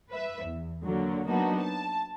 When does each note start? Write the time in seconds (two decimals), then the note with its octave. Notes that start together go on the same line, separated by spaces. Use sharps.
0.11 B4 E5
0.44 E2
0.83 D3 F#3 A#3
1.27 F#3 A#3 B3 D4 D#4 F#4
1.60 A5